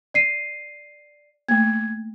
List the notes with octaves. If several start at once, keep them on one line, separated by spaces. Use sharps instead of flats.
D5 C7 D#7
A3 A#3 G#6